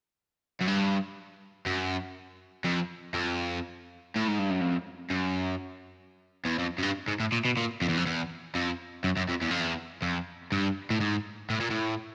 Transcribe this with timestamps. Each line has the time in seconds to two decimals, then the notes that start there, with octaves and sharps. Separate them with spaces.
0.61 F#2
0.68 G2
1.66 F#2
2.65 F2
3.14 F2
4.16 A2
4.28 G#2
4.39 G2
4.50 F#2
4.61 F2
5.10 F#2
6.45 E2
6.59 F2
6.78 F#2
6.83 G2
7.08 G#2
7.20 A2
7.32 A#2
7.45 B2
7.57 A#2
7.82 F2
7.89 E2
7.97 F2
8.06 E2
8.55 F2
9.04 F#2
9.17 F#2
9.29 F2
9.41 E2
9.51 F2
9.60 E2
10.02 F2
10.52 G2
10.90 A2
11.00 G#2
11.50 A2
11.60 A#2
11.70 A2